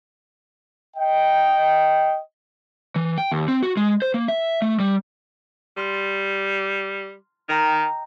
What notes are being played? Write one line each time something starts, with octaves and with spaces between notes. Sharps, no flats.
D#5 G5
E3
G5
D#2
C4
F#4
G#3
C5
A#3
E5
A3
G3
G3 C6 F6
A6
D#3 D#5 G5 A#5